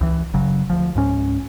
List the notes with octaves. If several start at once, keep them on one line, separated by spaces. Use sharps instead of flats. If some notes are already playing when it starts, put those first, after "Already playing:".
C#2 E3
F#1 C#3 F#3
D2 F3
C#2 G#2 C#4